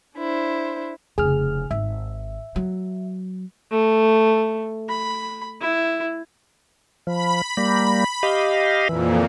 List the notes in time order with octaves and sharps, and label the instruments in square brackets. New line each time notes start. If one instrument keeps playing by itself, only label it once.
[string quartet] D4 E4 C5
[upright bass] F1 C#3 [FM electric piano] G#4 F6
[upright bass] G#1 [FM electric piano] E5
[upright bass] F#3
[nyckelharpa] A3
B5
E4
[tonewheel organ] F3 [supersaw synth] B5
[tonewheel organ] G3 A#3
G4 D#5 F5
[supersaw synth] F2 A#2 [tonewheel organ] E3